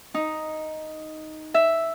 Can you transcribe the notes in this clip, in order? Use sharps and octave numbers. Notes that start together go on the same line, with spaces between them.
D#4
E5